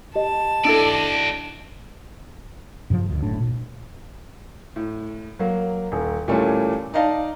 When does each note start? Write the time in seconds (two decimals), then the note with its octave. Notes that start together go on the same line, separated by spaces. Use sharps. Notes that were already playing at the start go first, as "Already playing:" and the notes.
0.15 G4 D#5 A5
0.65 D4 E4 F#4 A4 D5
2.90 G2 C#3 E3 F3
3.10 D2
3.23 F#1 A2 D4
3.40 A#2
4.76 A2
5.39 F#3 A#3
5.92 D#1
6.28 A#2 E3 G3 A3 C#4
6.94 D#4 D5 D#5 F5 A5